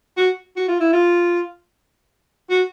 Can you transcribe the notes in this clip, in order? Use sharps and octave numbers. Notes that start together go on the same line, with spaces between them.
F#4
F#4
F4
E4
F4
F#4